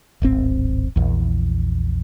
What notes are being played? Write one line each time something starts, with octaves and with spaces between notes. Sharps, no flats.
D1 G#1 C4
A#1 E2